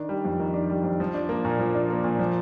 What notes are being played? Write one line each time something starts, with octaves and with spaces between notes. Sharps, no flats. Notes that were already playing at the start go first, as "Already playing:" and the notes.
Already playing: D#3 D4
G3
F2
D#3
D4
G3
F2
F3
D4
A#3
A#2
F3
D4
A#3
A#2
F3